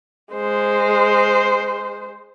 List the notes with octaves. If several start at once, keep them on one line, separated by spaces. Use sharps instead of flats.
G#3 C5